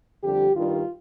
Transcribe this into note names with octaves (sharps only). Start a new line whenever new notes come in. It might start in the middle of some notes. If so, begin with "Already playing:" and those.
F2 D3 G3 G4
G2 D#3 G3 D4 F4